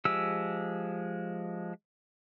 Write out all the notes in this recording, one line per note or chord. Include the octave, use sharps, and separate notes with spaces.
F3 G#3 G4 E6